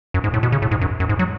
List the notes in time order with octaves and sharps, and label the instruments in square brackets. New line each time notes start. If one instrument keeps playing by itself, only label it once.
[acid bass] F#2
G#2
A2
B2
C#3
A2
G#2
F#2
F#2
G#2
F#3